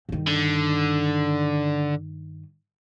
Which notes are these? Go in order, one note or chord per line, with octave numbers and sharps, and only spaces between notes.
G2 D#3
D3